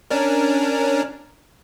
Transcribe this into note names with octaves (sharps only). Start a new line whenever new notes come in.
C#4 D4 A#4